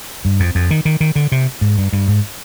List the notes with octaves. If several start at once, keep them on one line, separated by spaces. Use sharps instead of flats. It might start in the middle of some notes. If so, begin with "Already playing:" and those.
G2
F2
F2
D#3
D#3
D#3
D3
C3
G#2
G2
G2
G#2